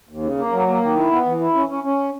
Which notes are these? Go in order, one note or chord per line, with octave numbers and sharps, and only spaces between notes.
D#2
C#3
A#3
F#3
A#3
D#3
E4
B3
E3
E4
C#4
C#4
C#4